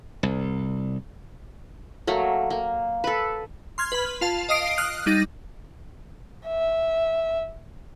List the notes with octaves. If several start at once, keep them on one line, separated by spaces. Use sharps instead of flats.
C2
F#3 A3 A#3
A#3
A4 B4
C6 F6 G#6
B4 B5
F4 F5 A5
D#5 F5 D#6 C7 D7
D#6 F6 F#6
G3 D#4 A6 A#6
E5